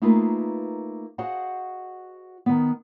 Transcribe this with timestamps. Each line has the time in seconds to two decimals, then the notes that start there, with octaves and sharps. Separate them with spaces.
0.02 A3 A#3 D#4 F4 G#4 B4
1.18 F#4 G#4 C5 D#5 F5 F#5
2.46 D#3 B3